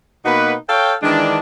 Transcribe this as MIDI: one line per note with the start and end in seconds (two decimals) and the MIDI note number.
0.25 0.54 47
0.25 0.54 58
0.25 0.54 63
0.25 0.54 66
0.25 0.54 71
0.69 0.94 69
0.69 0.94 73
0.69 0.94 77
0.69 0.94 79
1.03 1.39 51
1.03 1.39 52
1.03 1.39 56
1.03 1.39 62